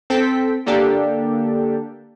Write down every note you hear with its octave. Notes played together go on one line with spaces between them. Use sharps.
C4 A4 G5 B6
D3 A#3 D4 G4 A4